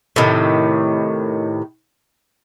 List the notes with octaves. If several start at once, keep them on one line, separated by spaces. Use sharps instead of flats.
A2 C3 D#3